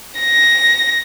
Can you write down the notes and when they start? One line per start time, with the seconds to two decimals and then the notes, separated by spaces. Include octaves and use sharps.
0.20 A#6